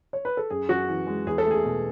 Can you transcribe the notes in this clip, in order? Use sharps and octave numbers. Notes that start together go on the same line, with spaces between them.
C#5
B4
A4
F#2 G#4
F#2 F#4
E3
G#3
E2 G#4
A4
A3
G#4
B2